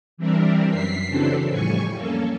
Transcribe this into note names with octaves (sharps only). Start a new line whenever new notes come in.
E3 G3 C4 D4 E4 A#4
F#2 B6 C7
C#3 E3 F#3 C4 D4 A4
F2 A2 G3 G#5 C#6
A#3 C#4 A4